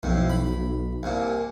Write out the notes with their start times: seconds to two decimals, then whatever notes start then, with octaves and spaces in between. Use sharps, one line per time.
0.03 B1 F2 A2
0.30 B5
1.03 C2 A#2